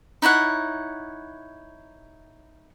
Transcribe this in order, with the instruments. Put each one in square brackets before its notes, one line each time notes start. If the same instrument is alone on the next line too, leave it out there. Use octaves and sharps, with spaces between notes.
[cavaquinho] D#4 E4 C#5 F#5